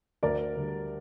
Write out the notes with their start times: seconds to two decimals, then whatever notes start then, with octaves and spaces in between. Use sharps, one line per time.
0.23 D2 A#4 D5
0.56 D3 G3